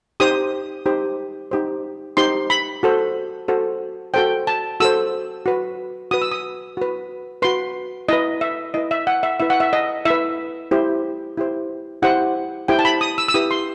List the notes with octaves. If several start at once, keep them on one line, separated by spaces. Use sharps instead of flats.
D#4 G4 C5 D#6
D#4 G4 C5
D#4 G4 C5
D#4 G4 C5 C6
B5
F#4 A4 C5
F#4 A4 C5
F#4 A4 C5 G5
A5
F#4 A4 C5 E6
F#4 B4
F#4 B4 D#6
E6
D#6
F#4 B4
F#4 B4 C6
E4 B4 D#5
E5
E4 B4 D#5
E5
F#5
E5
E4 B4 E5
F#5
E5
D#5
E4 B4 E5
E4 G4 C5
E4 G4 C5
E4 G4 C5 F#5
E4 G4 C5 G5
A5
B5
D#6
E6
E6
E4 G4 B4 D#6
C6